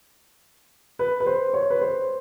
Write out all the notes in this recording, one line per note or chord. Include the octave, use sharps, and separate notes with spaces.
B4
B4
C5
C#5
B4
C5